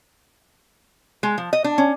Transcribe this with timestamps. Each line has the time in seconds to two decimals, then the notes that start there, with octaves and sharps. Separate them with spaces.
1.23 G#3
1.38 F3
1.53 D#5
1.64 D4
1.78 C#4